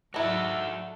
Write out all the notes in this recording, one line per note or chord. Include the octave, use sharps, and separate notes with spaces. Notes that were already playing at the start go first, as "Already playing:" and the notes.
G#2 F#3 D4 E4 F#4 A4